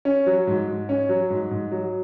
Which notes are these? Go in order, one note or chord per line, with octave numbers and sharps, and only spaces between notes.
C#4
F#3
G#2
G#2
C#4
F#3
G#2
G#2
F#3